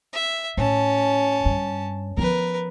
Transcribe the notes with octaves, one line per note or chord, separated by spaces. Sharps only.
E5
A2 C#4 A5
G2
F3 B3 A#4 B4